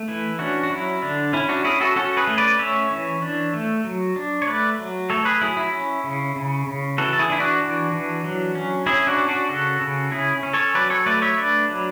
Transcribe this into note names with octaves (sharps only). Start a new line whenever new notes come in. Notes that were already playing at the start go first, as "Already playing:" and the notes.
Already playing: A3
E3 E4
C#4 D4 F#4
F#4
F#3 E4
D3 D4
C#4 E4
D4 F#4
C#4 E4 G#4
F#4 A4
C#4 F#4 A4
G#4 B4
A3
B4 D5
C#4 C#5 E5
E3
D4
A3
F#3
D4
C#5
A3 B4 D5
F#3
A3 A4 C#5
G#4 B4
F#3 E4 G#4
E4
C#4
C#3
C#3
C#3
E3 F#4 A4
A4
E4 G#4
D4
E4
D4 F#4
E3
E3
F#3
C#4
C#4 E4 G#4
D4 F#4
C#4
D4 F#4
C#3 F#4 A4
C#3
C#4 E4 G#4
C#4
A4 C#5
F#3 B4 D5
A4 C#5
A3 B4 D5
C#5 E5
D4 B4 D5
F#3